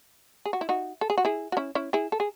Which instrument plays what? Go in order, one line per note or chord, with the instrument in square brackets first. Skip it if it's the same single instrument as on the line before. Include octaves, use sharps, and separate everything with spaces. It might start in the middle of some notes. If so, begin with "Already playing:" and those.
[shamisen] G#4
F#4
E4
D#4 F#4
A4
G#4
F#4
E4 G#4
F#4
C#4 E4
C#4 E4
E4 G#4
A4
G#4